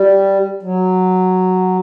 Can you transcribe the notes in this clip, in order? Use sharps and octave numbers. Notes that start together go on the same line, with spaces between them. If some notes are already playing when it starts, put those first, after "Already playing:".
Already playing: G3
F#3